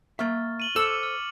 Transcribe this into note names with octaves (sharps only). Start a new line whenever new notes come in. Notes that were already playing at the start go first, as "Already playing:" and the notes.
A#3 E5 C#6 F6 A6
D#7 F#7 G7
A4 C5 D6 E6 F6 C#7 D#7
F6